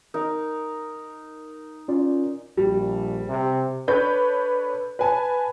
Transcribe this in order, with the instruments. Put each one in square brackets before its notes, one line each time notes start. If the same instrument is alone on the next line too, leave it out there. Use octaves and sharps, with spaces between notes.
[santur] D#4 A#4
[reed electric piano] C#4 F4 D5
[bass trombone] A#1 [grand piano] G3
[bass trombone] C3
[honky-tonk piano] D4 A4 B4 C#5 G6
B4 G#5 A5